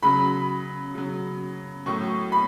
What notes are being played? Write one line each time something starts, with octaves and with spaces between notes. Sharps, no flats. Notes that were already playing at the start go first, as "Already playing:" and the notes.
C#3 F#3 B5
C#3 F#3
A2 F#3 C#6
B5